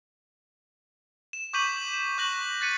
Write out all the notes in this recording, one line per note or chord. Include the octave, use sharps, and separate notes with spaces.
E7
C#6 D6 G6 B6 D#7 F#7
E7
C#6 F#6 A#6 F#7
F#6 A6 B6 C#7 D#7